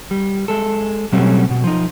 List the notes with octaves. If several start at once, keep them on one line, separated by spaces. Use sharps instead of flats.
G3
G#3 A4
B2 F#3 G3 A3 C4 C#4
B2
F3 D#4